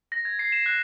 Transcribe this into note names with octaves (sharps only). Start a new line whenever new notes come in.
A#6
G#6
C7
E7
F#6